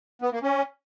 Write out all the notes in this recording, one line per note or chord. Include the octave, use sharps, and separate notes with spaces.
B3
A#3
C#4